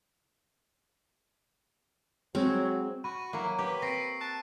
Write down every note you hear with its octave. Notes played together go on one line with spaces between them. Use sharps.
F#3 G#3 C4 F#4 C#5
F#4 B5 C#6 D#7
F#3 A#3 E4
G4 B4 D6
C4 C#6 A#6 C7 D7
A5 F#6